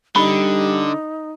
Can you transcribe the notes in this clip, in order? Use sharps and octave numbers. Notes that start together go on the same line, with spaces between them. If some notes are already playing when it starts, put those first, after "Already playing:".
D3 G3 D#4 B5